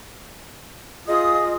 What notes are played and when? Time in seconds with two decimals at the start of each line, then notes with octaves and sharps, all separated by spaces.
1.08 F4 G#4 D#5 D#6